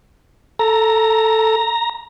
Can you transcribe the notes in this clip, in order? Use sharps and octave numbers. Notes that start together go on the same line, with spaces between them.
A4 A#5